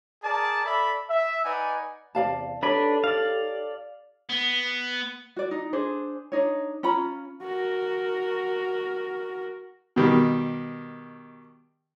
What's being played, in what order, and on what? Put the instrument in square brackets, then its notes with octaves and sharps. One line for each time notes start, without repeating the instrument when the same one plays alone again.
[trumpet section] G#4 A#4 D5 A5
A4 D5 E5 B5
E5
D#4 B4 D5 F#5 G#5
[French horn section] E2 C3 [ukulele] D5 F5 A5
[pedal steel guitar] D4 B4 D5 [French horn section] D#4 G4 A4 [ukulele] C#5 B5
[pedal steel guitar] D5 F5
[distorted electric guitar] B3
[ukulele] F#4 D5
D#4
D4 G#4 C5
D4 D#4 C#5
C#4 F4 A#5 B5
[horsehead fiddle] F#4 A#4
[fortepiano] B2 D#3 G3